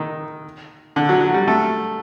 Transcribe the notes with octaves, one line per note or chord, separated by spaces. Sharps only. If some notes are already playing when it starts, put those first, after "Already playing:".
Already playing: D#3
D3
F#3
F#3
G3
A3